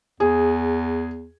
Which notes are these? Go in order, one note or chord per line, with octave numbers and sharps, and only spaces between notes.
E2 G#4